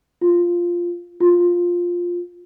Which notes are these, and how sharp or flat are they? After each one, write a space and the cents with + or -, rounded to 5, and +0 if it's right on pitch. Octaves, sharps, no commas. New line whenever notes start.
F4 -5
F4 +5